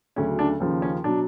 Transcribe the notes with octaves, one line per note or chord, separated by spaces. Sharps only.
D2 C#3 F#3 C#4
D4
D#2 C#3 F3
C#4
B2 F#3 D4